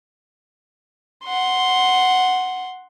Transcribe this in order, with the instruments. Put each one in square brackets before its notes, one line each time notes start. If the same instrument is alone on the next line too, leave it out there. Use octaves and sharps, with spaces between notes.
[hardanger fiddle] F#5 C6